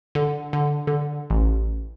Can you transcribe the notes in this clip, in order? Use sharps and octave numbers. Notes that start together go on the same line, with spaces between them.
D3
D3
D3
A1